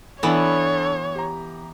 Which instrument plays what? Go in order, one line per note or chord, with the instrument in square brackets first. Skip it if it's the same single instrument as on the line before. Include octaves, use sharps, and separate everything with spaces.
[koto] E3 B3 [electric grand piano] D4 E4 A4 [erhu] C#5
[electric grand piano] G4 A#5